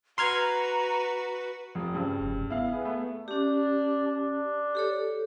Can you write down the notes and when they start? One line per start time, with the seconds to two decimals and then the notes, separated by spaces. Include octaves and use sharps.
0.18 F#4 B4 A#5 C6 F6 G#6
1.75 F1 F3
1.94 G2 C#3
2.20 F1
2.50 B3 E4 F5
2.73 G#4
2.85 A3
3.28 C#4 D4 G4
4.07 D4
4.75 G4 A4 C#5